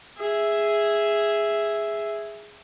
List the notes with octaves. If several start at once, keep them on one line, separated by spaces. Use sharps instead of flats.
G#4 E5